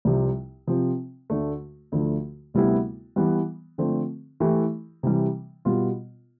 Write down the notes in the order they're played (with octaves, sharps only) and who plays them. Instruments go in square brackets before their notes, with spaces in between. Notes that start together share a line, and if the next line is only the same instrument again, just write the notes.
[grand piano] C2 C3 F3
C3 F3 C4
D2 D3 A3
D2 D3 F3 A3
D2 C3 G3 B3 E4
E3 G3 B3
D3 F3 A3 C4
E3 A3 E4 G4
C3 E3 G3
B2 G3 B3 F4